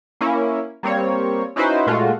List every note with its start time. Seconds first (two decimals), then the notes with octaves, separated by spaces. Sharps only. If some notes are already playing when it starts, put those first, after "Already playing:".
0.21 A#3 C#4 E4
0.83 G3 A#3 C4 C#5
1.56 C#4 D#4 E4 F#4 B4 C5
1.87 A#2 G#3 A3 F4 F#4